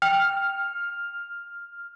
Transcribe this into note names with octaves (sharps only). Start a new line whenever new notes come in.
G5 F6